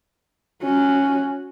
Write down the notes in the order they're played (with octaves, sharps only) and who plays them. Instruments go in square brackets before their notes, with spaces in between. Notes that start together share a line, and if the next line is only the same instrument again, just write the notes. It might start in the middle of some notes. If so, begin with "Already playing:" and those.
[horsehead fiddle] C#4 F#4